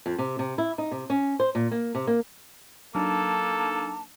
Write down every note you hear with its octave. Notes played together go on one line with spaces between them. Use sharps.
F2
C3
C3
E4
D#4
C3
C#4
C5
A#2
A#3
C3
A#3
F#3 A#3 D4 D#4 A4 A5